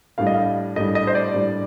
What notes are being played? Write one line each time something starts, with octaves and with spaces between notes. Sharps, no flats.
A2 G3 D4 F5
D#5
F5
A2 G3 D4 D#5
D#5
C5
D5
A2 G3 D4